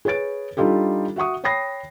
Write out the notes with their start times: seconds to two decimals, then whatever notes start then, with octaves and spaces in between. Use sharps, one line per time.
0.05 G#4 B4 C#5 A6 D7
0.57 G3 D4 D#4 F4 G4 A4
1.16 F#4 E5 F#5 C#6 D#6
1.44 C#5 G5 B5 D#6 A#6 C7